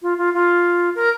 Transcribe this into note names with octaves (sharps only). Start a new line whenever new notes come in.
F4
F4
F4
A#4